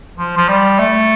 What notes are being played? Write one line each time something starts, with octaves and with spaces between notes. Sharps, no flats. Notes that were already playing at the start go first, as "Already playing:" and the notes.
F3
F3
G3
A3